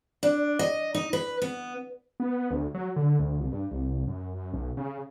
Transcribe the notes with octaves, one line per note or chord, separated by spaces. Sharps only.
D4
D#5
D#4
B4
B3
B3
D2
F#3
D3
D2
C2
G2
C2
F#2
B1
C#3